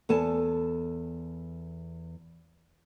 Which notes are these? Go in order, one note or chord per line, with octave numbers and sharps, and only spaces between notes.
E2 A4 G#5 A5